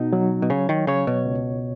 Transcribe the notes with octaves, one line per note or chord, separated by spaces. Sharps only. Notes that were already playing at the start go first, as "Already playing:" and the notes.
Already playing: B2 D#4
F#3
B2
C#3 C#5
D#3
C#3 C#5
B2
C#2